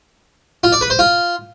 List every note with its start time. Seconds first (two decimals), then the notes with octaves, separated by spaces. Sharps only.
0.64 F4
0.72 D5
0.81 B4
0.90 C5
0.99 F4